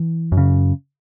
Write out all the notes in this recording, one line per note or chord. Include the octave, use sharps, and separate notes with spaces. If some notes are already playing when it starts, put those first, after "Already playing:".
Already playing: E3
F#2
C#3